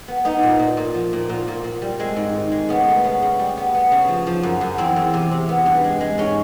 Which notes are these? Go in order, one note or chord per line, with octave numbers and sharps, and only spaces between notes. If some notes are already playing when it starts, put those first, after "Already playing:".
B3
B3 D#4
A#2
A#2
A#2
F3
A#2
A#2 F4
A#2
A#2
G3
G#3 C4
G#2
D#3
G#3
C#3 B3
A3
C#3 B3
C#3
G3
B3
B3
C#3
F3
F3
F#2
F#2
E2 C4
E2
C3
C3
B3
G2
G#3
G#3
G#2 C#4